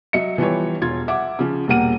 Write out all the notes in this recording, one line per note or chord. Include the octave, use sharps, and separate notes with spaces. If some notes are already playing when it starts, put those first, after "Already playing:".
F#3 D#5 E5 C#7
E3 F3 G3 B3 G4 C#5
E1 F4 G#6
E5 F#5 D6
C#3 F3
E1 A#2 G3 A#3 F#5 D#7